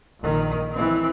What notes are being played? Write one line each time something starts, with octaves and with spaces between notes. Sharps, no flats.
A#1 D#3
E3 C4